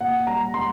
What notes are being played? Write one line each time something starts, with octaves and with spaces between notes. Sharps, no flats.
A#2 F#5
G3 A#5
G3 C6